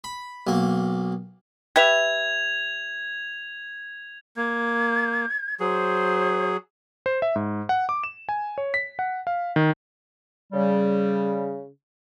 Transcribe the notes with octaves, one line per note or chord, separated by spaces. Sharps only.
B5
B1 A#3
G4 B4 E5 G#6 F7
A#3 G#6
F#3 G#4 C5
C5
E5
G#2
F#5
D6
E7
G#5
C#5
B6
F#5
F5
D#3
C#3 G3